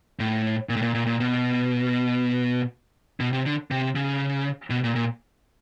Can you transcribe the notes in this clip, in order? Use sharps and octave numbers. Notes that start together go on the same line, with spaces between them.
A2
A#2
A2
A#2
A#2
A#2
B2
B2
C3
D3
C3
C#3
B2
A#2
A#2